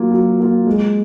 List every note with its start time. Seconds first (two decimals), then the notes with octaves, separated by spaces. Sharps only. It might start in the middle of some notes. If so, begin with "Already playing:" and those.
Already playing: F#3 A#3 F4
0.11 F#3
0.40 A#3 F4
0.66 G#3